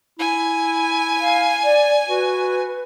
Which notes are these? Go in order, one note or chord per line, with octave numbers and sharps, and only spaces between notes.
E4 G#5
F5
D5
F#4 B4